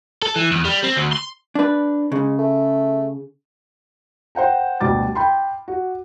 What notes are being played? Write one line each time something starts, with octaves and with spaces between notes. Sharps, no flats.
A4
E3
E2
G3
C4
D2
C6
D4 B4
C#3 G#3
A3
C5 F#5 G5 A#5
D2 B2 G3 D6 A6
G5 B5 C6
F#4